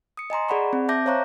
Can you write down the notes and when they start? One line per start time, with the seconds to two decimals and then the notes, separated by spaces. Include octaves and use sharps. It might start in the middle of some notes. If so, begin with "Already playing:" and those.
0.17 D#6 C#7
0.30 D#5 G#5 A#5 C6
0.49 G#4 D5 F#5 B5 C#6
0.73 C4
0.89 E5 A5 D6 G6 A#6
1.05 C5 C#5 F5 A#5 C#6 F#6